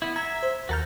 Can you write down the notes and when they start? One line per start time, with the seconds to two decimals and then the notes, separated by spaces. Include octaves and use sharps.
0.02 B3 E4
0.16 E5 A#5 G#6
0.43 C5
0.69 D#2 F#4 A4 A#5 F6 G6